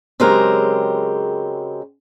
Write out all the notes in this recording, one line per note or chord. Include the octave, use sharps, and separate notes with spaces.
C#3 F#3 G#3 C4 G4 A#4